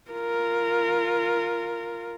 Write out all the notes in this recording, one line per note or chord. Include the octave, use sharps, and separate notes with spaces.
F4 A#4